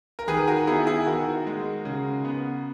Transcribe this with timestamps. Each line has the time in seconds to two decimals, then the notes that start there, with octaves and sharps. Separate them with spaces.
0.19 A#4
0.28 D#3 G#4 B4
0.47 F#4 A#4
0.67 B3 E4 G#4
0.87 E4 G#4
1.06 D#3 F#4 A#4
1.47 G#3
1.85 C#3
2.25 B3